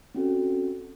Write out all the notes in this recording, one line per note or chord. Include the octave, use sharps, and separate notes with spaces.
C4 C#4 F#4 A4